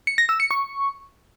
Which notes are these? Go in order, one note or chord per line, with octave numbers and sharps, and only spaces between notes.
C#7
A#6
E6
C#7
C#6